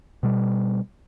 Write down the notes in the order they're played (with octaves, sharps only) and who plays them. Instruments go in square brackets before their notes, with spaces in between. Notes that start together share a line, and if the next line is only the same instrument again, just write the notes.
[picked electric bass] B2 G3